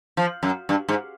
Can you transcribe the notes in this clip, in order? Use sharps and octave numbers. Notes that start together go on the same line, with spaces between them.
F3
F#2
G2
G#2